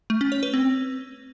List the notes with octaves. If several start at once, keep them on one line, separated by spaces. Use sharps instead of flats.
A3
C#4
C#5
B4
C4